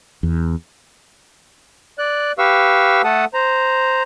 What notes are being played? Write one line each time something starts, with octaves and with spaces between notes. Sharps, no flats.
E2
D5 F#6
G4 B4 F5 C#6 E6
A3 A4 F#5 A5 D#6
C5 A#5